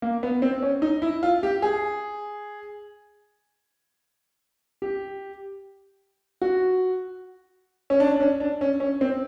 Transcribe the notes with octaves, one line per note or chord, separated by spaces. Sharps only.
A#3
B3
C4
C#4
D#4
E4
F4
G4
G#4
G4
F#4
C#4
D4
D4
C#4
D4
C#4
C#4
C4